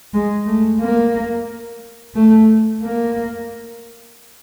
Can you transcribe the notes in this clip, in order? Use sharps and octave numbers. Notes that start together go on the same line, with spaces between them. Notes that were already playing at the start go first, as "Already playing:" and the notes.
G#3
A3
A#3
A3
A#3